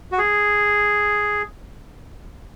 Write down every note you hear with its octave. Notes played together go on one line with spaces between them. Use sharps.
F#4
G#4